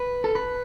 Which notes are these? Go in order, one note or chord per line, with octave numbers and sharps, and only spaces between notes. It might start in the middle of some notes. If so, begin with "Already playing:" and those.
Already playing: B4
A4
B4